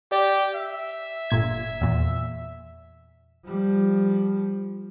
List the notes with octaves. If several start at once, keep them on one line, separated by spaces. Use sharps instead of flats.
G4 D5
E5
G1 A#2 G#6
E2 A#2
F3 G3